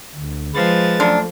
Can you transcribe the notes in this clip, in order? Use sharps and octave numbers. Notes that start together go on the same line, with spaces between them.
D2
F3 G#3 B4 A6
F#2 A3 D4